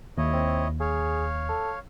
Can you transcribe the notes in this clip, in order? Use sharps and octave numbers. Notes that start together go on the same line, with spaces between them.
D#2 E4 C#5 D#5
C4
G#4 C#5 F5
A4